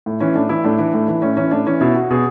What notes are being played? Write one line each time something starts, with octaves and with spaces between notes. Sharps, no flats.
A2
E3 C#4
A2 D4
E3 E4
A2 D4
E3
A2
E3
A2 C#4
E3 C#4
A2 D4
E3 C#4
B2 E4
F#4
B2 G#4